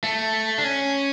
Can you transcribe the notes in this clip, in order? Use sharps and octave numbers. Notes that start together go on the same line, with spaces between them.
A3
D4
C#4